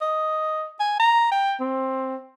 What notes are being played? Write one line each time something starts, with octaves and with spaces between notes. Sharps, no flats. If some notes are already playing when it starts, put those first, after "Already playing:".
D#5
G#5
A#5
G5
C4